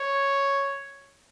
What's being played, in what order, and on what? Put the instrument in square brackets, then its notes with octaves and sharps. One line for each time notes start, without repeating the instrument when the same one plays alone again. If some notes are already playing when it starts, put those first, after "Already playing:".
Already playing: [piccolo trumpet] C#5